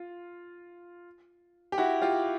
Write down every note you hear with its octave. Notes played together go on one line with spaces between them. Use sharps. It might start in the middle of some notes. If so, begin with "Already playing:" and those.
Already playing: F4
G4
E4 F#4
F4 G4